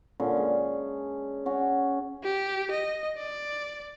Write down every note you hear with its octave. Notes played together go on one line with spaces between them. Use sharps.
A#2 D3 C#4
G#3
C#4 F#4
G4
D#5
D5